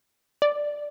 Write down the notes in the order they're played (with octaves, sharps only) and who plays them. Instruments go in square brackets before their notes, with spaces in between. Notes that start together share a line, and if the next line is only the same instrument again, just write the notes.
[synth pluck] D5